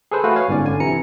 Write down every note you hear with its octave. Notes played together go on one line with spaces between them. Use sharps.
G#4 A4 B4 C5
A3 F#4 B4 F5
C#5 F5 G#5
G1 G#2 C#4 D5
D3 G#5
C3 E3 A#5 C#7